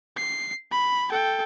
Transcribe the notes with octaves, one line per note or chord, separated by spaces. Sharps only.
C7
B5
A4 G5